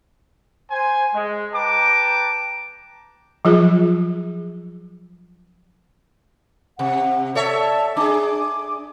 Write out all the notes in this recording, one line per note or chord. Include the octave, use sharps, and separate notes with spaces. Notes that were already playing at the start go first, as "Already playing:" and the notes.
C5 G#5
G#3
B4 G5 A5 A#5 D6
F3 F#3 F4 G#4
C3 F#5
A4 C#5 D5 E5 A5
D4 G#4 G#5 D6